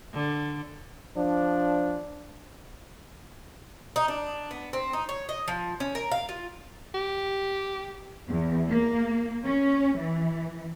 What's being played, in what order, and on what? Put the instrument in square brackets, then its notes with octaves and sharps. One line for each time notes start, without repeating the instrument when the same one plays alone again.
[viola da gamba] D3
[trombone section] F3 D4
[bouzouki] D#4
D4
B3
C4
D#4
C#5
D#5
F3
C#4
A#4
F5
F4
[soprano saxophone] G4
[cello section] E2
A#3
C#4
E3